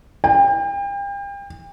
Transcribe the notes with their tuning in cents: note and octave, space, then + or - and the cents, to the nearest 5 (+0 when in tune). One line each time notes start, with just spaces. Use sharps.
G5 +35